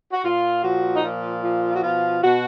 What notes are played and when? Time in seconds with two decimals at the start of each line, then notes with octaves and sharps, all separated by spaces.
0.12 F#4
0.24 A#2 F4
0.63 F3 F#4
0.94 D#4
1.03 A#2 F4
1.43 F3
1.75 F#4
1.83 B2 F4
2.23 B2 F#4